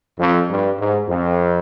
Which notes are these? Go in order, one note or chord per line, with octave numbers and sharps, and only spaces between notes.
F2
G2
G#2
F2